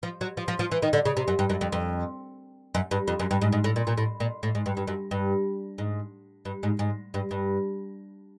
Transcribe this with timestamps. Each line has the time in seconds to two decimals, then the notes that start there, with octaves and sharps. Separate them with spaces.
0.03 F3
0.21 F#3
0.37 F3
0.48 F3
0.59 F3
0.71 E3
0.82 D#3
0.93 D3
1.05 C#3
1.17 C3
1.28 F#2
1.39 G2
1.50 F#2
1.61 F2
1.72 F2
2.75 F#2
2.91 G2
3.08 F2
3.19 F#2
3.31 G2
3.42 G#2
3.52 G#2
3.64 A2
3.76 A#2
3.87 A#2
3.98 A2
4.20 A#2
4.43 A2
4.55 G#2
4.66 G2
4.77 G2
4.87 F#2
5.11 G2
5.78 G#2
6.45 G2
6.63 G#2
6.79 G#2
7.14 G2
7.31 G2